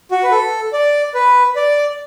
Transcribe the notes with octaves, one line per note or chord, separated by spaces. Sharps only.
F#4
B4
A4
D5
B4
D5